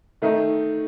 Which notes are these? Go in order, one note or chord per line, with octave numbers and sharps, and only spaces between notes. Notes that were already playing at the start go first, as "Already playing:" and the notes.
D#3 A3 D#4